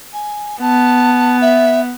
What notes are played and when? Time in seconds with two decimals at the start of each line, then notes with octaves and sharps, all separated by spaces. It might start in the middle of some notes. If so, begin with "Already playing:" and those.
0.13 G#5
0.61 B3 A5
1.42 E5